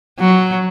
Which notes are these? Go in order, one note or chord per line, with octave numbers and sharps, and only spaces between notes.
F#3